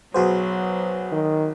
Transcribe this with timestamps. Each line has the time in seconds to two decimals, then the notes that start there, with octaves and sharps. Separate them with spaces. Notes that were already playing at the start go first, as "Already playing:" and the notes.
0.14 B1 F#3 F#4 G#4 B4 C5
1.12 D#3